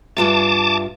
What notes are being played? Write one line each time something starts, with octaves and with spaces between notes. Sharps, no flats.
G2 F4 E5 A5 D6